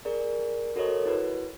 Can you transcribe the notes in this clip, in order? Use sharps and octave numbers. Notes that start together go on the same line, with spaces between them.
G#4 A#4 D5
F#4 A4 A#4 C5 C#5 D#5
E4 F#4 B4